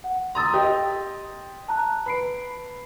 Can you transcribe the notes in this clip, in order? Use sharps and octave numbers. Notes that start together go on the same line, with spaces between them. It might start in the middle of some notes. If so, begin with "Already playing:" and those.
F#5
A#5 C6 D#6 E6 A6
G4 D#5
A5 A#5 F#6
B4 B5 C7 D7